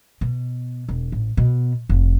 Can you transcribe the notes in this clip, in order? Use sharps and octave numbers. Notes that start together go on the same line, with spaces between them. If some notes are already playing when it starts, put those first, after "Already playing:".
B2
E1
A1
B2
F1